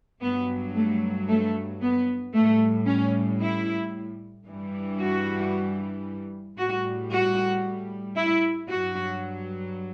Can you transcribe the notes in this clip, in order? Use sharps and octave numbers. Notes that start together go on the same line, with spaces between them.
G2 F#3 B3
A3
A3
B3
A2 G3 A3
C#4
E4
G2 E3 G3
F#4
A2 G3 F#4
F#4
E4
G2 F#3 F#4